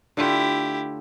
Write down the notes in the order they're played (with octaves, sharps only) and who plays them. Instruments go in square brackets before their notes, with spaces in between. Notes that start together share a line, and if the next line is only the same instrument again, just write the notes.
[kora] D3 A3 F4 [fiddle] E4 G4